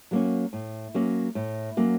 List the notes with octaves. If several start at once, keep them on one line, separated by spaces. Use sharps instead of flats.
F#3 A#3 C#4
A2
F#3 A#3 C#4
A2
F#3 A#3 C#4